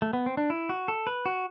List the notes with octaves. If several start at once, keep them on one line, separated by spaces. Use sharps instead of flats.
A3
B3
C4
D4
E4
F#4
A4
B4
F#4